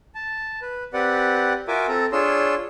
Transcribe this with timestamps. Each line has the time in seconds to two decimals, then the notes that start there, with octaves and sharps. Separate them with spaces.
0.15 A5
0.62 B4
0.93 C4 G4 B4 D5 F#5
1.68 F4 F#4 A#4 E5 G#5 D6
1.88 C4 A4 A#5
2.12 D4 F4 G#4 C#5 C6 E6